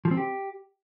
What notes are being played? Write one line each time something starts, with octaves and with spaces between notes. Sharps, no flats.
F3
C4
G4